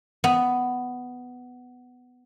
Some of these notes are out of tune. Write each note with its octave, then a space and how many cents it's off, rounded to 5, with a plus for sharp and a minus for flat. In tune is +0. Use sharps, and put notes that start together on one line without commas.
B3 +10